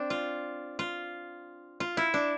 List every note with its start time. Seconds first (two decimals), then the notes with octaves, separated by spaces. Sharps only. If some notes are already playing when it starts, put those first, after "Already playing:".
Already playing: C4 D4
0.10 F4
0.79 F4
1.80 F4
1.97 E4
2.14 D4